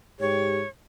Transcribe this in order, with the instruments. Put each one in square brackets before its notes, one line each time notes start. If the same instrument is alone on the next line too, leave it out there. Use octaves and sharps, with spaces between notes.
[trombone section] G#2 G4 [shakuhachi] C#5